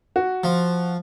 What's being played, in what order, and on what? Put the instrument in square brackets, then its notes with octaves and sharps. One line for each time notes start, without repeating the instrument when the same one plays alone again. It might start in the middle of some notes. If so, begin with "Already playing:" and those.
[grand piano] F#4
[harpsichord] F3